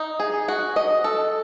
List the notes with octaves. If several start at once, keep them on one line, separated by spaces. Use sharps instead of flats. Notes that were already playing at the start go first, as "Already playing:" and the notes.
Already playing: D#4
G#4
F#4
D#5
A4